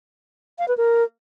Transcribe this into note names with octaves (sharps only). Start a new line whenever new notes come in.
F5
B4
A#4